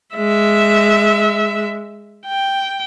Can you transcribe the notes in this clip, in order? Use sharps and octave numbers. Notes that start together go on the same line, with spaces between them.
G#3 E5
G5